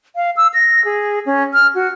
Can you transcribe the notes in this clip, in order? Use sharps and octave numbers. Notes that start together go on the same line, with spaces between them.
F5
E6
A#6
G#4
C#4
F6
F#4